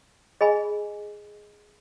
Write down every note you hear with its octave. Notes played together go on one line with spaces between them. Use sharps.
G#4 D#5 G#5 B5